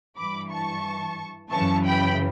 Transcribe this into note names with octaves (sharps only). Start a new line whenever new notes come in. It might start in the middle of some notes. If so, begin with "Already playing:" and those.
G2 E3 B5 D6
A5 C#6
F#2 C#3 E3 A5 C#6
G5 B5